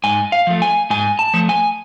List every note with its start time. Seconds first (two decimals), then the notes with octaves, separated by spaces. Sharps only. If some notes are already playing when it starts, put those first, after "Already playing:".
0.04 G#2 G#5
0.32 F5
0.47 F3 A3
0.62 G#5
0.90 G#2 G#5
1.19 A5
1.34 F3 A3
1.49 G#5